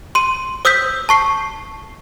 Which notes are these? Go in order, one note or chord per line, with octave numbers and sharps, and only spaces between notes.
C6 D#7
C5 D#6 E6 G6 B6
A5 C#6 C7